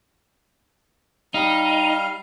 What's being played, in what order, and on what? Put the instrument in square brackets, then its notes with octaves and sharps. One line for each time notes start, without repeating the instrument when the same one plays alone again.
[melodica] G3 F5 [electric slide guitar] D#4